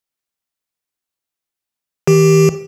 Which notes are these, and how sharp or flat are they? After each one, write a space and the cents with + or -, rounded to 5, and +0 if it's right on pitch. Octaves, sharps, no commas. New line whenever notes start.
D#3 +40 G4 +0